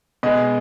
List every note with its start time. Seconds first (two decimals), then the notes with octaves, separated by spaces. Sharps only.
0.23 B2 G#3 D#5